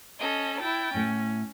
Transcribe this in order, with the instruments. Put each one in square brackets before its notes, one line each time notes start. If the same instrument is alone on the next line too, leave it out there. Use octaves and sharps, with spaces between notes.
[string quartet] C#4 A4 D#5
E4 G5 A6
[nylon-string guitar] A2 A3 [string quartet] C#4